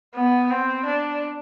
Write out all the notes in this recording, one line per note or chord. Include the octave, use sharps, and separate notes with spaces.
B3
C4
D4